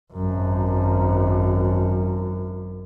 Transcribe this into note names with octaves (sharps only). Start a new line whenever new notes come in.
G#1 F#2